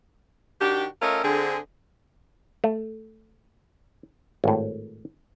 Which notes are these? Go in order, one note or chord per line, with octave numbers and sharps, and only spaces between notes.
D#3 D4 F#4 G4
A3 C#4 F4 A4 A#4 D#5
D3 C4 G#4
A3
G#1 A2